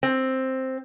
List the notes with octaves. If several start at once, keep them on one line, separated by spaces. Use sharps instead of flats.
C4